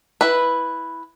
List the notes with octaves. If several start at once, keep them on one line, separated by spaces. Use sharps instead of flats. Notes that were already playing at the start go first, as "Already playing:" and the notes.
E4 B4